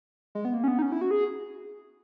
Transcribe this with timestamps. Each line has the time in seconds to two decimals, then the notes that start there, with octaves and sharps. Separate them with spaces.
0.35 G#3
0.45 B3
0.54 A#3
0.64 C#4
0.68 B3
0.79 D#4
0.82 C#4
0.92 E4
1.01 F#4
1.11 G#4